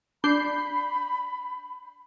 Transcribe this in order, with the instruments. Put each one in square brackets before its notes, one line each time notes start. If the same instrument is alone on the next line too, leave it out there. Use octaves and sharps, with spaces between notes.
[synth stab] D4 G6 C7 [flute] B5